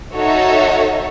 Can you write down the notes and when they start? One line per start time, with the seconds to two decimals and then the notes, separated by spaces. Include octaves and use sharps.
0.15 D#4 F#4 A4 C#5 E5